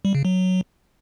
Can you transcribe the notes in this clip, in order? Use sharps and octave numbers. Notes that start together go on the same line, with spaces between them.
G3
C#3
F#3